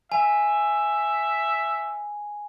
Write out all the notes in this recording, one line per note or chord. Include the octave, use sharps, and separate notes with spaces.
E5 G#5